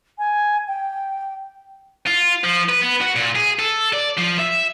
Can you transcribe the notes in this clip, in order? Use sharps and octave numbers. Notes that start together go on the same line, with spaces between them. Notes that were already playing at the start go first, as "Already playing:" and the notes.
G#5
G5
F4
F3
B4
B3
F#4
A#2
G#4
A4
D5
F3
E5